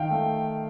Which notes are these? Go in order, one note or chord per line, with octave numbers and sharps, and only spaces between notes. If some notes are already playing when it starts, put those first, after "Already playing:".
Already playing: D#3 F5 G5
A3